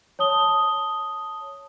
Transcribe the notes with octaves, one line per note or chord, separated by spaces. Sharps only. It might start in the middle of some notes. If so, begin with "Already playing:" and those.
C#5 A5 D#6 G7